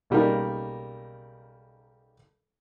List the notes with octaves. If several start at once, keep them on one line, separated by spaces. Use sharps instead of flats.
B1 C#3 G3 A#3 D#4 A#4